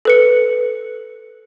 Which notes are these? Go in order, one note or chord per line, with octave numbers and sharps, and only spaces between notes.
A4 B4 C#7